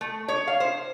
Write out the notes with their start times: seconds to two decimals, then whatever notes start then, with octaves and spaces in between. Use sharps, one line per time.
0.01 A3
0.28 C#5
0.47 F5
0.60 C5